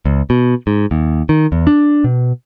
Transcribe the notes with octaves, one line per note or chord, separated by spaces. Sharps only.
C#2
B2
G#2
D#2
D#3
E2
D4
B2